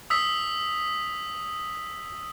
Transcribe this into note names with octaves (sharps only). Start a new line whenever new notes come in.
D#6 E6 B6